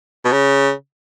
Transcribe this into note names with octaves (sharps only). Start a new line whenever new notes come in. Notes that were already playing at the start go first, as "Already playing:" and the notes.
B2
C#3